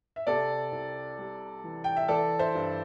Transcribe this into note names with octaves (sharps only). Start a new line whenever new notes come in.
E5
C3 A4 D5
C2
G3
E3
G5
E5
E3 A4 D5
C5 E5
G2